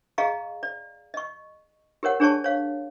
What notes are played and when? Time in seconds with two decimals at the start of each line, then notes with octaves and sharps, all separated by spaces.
0.18 G#4 D#5 F5 A#5 C#6
0.63 D5
1.14 D#5 C#6
2.03 G4 A#4 C#5 F#5
2.20 D4 G#4 C#5 D5 A5 C#6
2.44 C#5 F5